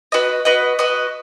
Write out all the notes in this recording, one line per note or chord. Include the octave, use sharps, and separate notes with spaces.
F#4 B4 D#5
F#4 B4 D#5
F#4 B4 D#5